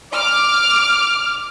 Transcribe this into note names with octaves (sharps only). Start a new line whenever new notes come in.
D6 F6